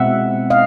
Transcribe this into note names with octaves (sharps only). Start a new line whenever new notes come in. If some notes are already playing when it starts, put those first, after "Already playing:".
Already playing: B2 G#3 C4 E5 F#5
D#5 F5